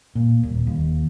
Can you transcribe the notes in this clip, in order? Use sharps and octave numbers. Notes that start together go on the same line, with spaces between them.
A#2
D#1
D#2